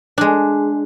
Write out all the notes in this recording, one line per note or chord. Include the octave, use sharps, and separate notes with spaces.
G#3 D4